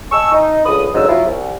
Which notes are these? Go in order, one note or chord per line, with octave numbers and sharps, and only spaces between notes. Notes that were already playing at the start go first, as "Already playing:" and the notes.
D#5 G#5 A5 C#6 E6
D#4
C#2 D3 B5 D#6
D2 G#2 C#3 F#3 D#5 E6
F#3 E4 F4
C2